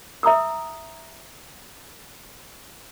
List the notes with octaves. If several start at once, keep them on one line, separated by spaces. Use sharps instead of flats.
E5 A#5 D#6 E6